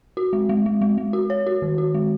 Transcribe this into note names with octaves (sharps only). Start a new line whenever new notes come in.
F#4
G#3
G#3
G#3
G#3
G#3
F#4
C#5
F#4
D#3
F#4
G#3